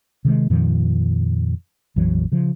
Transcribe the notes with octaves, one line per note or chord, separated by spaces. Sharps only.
C3 D#3 F#3 G#3
F2 A#2 D#3 F3
A#1 F2 E3 F#3
C#3 F3